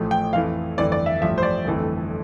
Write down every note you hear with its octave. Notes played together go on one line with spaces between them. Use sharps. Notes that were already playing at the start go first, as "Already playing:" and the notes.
Already playing: A1 A2 F3 A3
G5
F2 E3 A3 F5
G1 F2 E3 A3 D5
D5
E5
A1 G2 F3 A3 E5
C5
D5
G1 F2 E3 A3